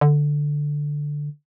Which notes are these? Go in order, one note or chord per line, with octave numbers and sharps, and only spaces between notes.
D3